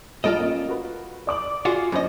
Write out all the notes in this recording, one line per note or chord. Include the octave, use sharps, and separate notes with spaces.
A#1 G3 F4 A4 D#5 D7
A3 A#3 C#4
F#4 A#4 B4
D5 D6 F#7
F4 F#4 G#4
F#2 D4 C5 D#5 B5